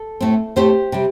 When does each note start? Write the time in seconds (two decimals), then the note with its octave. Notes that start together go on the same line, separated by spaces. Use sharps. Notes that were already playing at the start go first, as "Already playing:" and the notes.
Already playing: A4
0.21 A2 A3 C4
0.56 A2 A3 C4 G4 C5
0.92 C3 G3